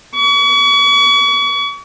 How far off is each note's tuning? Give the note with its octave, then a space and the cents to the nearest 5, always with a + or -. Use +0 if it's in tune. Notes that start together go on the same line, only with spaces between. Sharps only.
C#6 +40